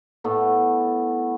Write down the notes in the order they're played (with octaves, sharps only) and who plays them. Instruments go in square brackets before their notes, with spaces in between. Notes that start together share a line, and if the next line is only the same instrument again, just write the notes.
[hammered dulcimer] A2 A3 B3